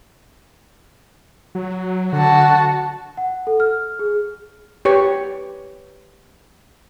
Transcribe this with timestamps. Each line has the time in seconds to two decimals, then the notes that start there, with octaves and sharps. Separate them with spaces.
1.55 F#3
2.13 D3 F#4 A5
3.17 F#5
3.47 A4
3.60 F6
3.99 G#4
4.85 G4 B4 C#5 C#6